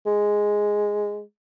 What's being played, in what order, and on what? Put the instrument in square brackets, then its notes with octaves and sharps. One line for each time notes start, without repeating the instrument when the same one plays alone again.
[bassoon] G#3